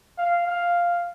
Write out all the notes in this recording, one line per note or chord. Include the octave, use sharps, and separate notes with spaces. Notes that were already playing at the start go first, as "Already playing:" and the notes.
F5
F5